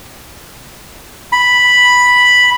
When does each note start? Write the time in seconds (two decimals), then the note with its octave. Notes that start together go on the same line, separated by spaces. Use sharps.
1.32 B5